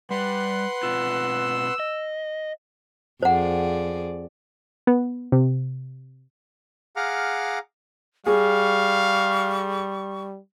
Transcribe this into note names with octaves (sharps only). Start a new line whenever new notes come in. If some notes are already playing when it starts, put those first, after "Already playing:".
G3 B4 F#5 C6
B2 C4 F4 E6
D#5
F2 G#4 C5 D5 F#5
B3
C3
G#4 F5 F#5 A#5 D6 F6
G3 G#4 F5 C#6